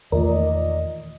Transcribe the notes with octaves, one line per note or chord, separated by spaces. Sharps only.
E2 A#2 D#3 A3 D5 D#5